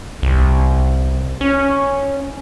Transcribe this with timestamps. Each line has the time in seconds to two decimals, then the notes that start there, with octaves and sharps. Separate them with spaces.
0.22 C2
1.41 C#4